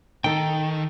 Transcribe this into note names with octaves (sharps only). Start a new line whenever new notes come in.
D#3 D#4 A4 G5